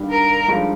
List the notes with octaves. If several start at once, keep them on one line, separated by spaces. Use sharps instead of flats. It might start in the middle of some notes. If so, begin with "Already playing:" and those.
Already playing: G1 G2 D#3
A#4
G1 G2 F3 G#3 D#4